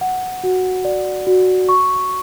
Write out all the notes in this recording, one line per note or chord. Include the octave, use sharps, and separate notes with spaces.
F#5
F#4
D5
F#4
C#6